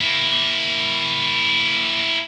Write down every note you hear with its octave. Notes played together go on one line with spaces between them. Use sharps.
A#3 E4